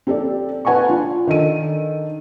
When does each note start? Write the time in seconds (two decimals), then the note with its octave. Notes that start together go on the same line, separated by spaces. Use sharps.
0.07 C4 G4 A4 D5
0.65 B4 F#5 G#5 A5 C#6
0.88 D4 F4
1.27 D#3 D4 A4 D#7